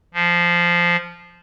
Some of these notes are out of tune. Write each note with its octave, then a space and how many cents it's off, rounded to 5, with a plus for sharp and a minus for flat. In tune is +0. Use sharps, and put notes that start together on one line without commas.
F3 -10